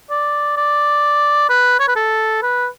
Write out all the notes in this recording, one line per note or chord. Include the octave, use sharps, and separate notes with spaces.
D5
D5
B4
C#5
B4
A4
B4